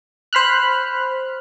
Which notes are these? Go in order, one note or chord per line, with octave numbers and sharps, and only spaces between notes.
C5 B5 F6 F#6